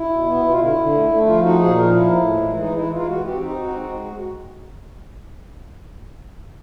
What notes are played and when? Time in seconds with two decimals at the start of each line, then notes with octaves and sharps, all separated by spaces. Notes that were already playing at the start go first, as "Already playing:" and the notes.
Already playing: E4
0.09 B2
0.26 B3
0.42 B2
0.48 F4
0.59 D3 E4
0.76 D3
0.92 A3
1.09 A3
1.26 F3 F4
1.41 D#4 F#4
1.58 A#2 G#4
1.75 F3 A#4
1.91 A2 E4
2.08 A2
2.24 G#3
2.42 E3
2.58 G#3 D#4
2.74 E3 E4
2.91 G#3 F4
3.07 E3 F#4
3.24 C4 G4
3.40 D#4
3.57 C4 F#4
3.74 G#3